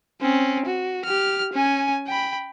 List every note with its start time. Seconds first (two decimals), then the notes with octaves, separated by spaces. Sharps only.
0.21 C4 C#4
0.66 F#4
1.05 G4 F6
1.53 C#4 G#5
2.08 G5 B5